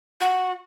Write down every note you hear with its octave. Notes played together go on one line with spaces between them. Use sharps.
F#4